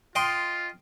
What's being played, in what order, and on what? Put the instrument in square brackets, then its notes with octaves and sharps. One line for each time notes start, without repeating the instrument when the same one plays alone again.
[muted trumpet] F4 [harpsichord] D#5 G5 C6